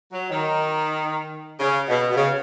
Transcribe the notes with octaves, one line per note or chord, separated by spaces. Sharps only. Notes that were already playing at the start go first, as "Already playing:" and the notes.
F#3
D#3
C#3
B2
B2
C#3